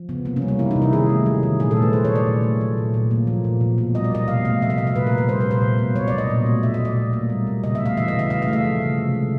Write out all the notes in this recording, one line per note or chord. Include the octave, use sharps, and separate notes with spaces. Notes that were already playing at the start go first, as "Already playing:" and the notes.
Already playing: F3
C#3 B3
C3 A#3
C#4
G3
A#3
E3 E4
D#4
C3
E4
D#3 G#4
A3
F#3
D#3
A#2 G#4
A4
A3
B4
F#3 C5
C#5
A#2
D5
A#2
A3
F#3
A#2
A#2
A#3
F3
A#2
B2
A#3
G3 D#5
D5
B2 D#5
C3 F5
A3 F5
F3 E5
D#5
C3 F5
E5
A#2 B4
A#4
A#3
B4
G3 C5
B4
A#2
C5
B2
A#3
F#3 C#5
B2 D5
D#5
A#2
A3
F#3 E5
D#5
A#2
D5
B2
A#3
G3
B2
C#3 D#5
E5
A3
F5
E3 E5
D#5
C#3
E5
C#3 F5
F5
A3
E5
F3
C#3
C3
G#3